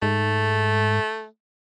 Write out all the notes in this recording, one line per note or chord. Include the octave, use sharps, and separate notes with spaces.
G#2 A3